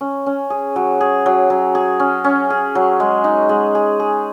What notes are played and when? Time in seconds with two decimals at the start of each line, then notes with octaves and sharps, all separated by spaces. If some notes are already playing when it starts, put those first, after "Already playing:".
0.01 C#4
0.26 C#4
0.50 G#4
0.76 F#3
1.01 G#4
1.26 F#3
1.50 F#3
1.75 G#4
2.00 C#4
2.24 C#4
2.50 G#4
2.75 F#3
3.00 G#3
3.24 D#4
3.49 G#3
3.75 G#4
4.00 G#4